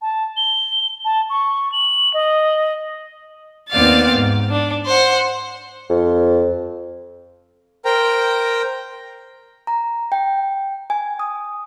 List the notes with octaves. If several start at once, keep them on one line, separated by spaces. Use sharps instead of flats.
A5
G7
A5
C#6
F#7
D#5
D#2 B3 C4 D5 F5 A6
G#2
D4
C5 F#5
F2
A#4 C5 G5 A#5
A#5
G5
G#5
D#6